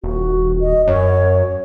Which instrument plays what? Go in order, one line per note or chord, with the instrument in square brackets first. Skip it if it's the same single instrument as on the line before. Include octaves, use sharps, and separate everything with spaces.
[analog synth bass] D#1 [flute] F#4
[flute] D#5
[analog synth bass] F#2 [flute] C#5